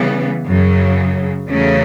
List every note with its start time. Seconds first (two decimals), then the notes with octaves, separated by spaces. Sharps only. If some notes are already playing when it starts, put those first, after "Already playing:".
Already playing: C#3 E3 G3 B3
0.47 F#2 C#3 F#3
1.48 E2 C#3 F#3 A3